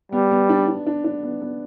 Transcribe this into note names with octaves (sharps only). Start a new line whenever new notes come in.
G3 B3
B3
D4
D4
D4
D4
B3
B3